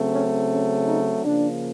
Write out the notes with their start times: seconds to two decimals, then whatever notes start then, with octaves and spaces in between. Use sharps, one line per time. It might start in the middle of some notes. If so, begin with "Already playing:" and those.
Already playing: C#3 F#3 A3 C4
0.12 C#4
0.49 C#4
0.86 D#4
1.24 C#3 F3 A#3 D4